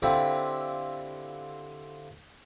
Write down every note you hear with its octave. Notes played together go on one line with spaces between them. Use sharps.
D3 C4 E4 F4 G4